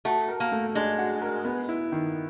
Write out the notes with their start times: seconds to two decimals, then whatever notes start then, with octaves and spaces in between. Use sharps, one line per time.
0.05 A3 F#4
0.28 A#4
0.40 A#3
0.52 A3
0.75 G#3 D4
0.98 F#4
1.22 A#4
1.45 B3
1.69 E4
1.92 D#3